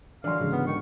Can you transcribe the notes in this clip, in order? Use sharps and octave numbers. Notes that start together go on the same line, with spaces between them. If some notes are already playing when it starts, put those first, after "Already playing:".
D3 E3 F#3 D5 F5 C6
G#2 C#3 G#3
B3
G#2 D#3 C#6